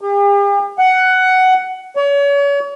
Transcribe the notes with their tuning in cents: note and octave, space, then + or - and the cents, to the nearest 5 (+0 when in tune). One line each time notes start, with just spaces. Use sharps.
G4 +45
F#5 +10
C#5 +35